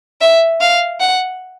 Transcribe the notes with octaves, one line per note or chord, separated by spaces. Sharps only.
E5
F5
F#5